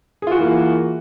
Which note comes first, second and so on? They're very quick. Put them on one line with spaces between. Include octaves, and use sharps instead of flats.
G#4 F4 F#4 E3 A#3